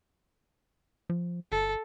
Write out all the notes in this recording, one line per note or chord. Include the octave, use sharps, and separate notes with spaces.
F3
G1 A4